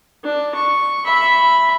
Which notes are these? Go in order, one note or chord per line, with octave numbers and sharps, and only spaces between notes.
D4
C#6
E5 B5